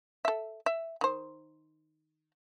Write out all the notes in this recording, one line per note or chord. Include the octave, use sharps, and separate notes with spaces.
A4 E5
E5
D#3 C5